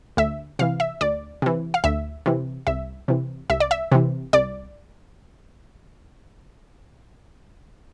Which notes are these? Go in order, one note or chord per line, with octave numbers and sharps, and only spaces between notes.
D2 E5
C3 E3 F5
E5
D2 D5
C3 E3
F5
D2 E5
C3 E3
C2 E5
C3 E3
C2 E5
D5
E5
C3 E3
C2 D5